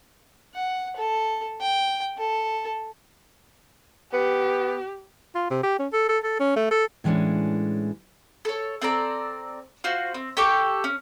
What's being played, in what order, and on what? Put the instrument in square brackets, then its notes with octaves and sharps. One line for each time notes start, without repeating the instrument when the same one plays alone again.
[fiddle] F#5
A4
G5
A4
[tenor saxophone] B3 [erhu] G4
[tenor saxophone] F4
C3
G4
C#4
A4
A4
A4
C#4
A3
A4
[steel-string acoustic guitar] A2 E3 G#3 B3 C#4 D4
[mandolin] A4 C#5
C4 A4 D5 A#5
F4 F#4 C5
C4
G4 A4 C#6 D6
C#4